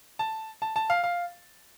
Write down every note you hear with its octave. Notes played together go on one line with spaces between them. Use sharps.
A5
A5
A5
F5
F5